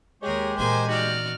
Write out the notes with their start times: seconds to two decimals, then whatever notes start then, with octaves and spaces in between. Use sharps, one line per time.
0.23 D#2 G#3 G4 G#4 A#4 C#5
0.58 A#2 E3 G#4 A#4 C5 G#5
0.88 D#4 F#4 D5 F6